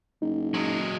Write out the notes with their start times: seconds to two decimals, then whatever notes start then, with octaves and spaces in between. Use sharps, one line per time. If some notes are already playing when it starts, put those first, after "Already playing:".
0.22 F#1 D#4
0.54 F#3 G#3